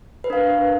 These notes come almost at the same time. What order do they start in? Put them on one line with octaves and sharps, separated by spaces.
B4 A#4 D4 F5